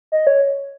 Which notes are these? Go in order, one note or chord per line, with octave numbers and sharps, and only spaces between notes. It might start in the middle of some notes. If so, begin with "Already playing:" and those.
D#5
C#5